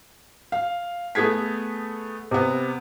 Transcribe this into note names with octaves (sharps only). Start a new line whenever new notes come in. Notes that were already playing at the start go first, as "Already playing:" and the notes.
F5
A3 B3 G#4 G#6 B6
C3 B3